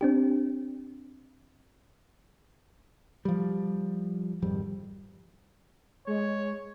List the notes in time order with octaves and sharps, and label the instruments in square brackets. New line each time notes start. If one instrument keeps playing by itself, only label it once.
[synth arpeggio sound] C4 D4 G4
[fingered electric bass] F3 G3
G#1 F2 G3
[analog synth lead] G#3 [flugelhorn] C#5